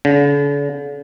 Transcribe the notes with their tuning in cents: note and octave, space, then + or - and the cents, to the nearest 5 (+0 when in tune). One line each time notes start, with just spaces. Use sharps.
D3 -45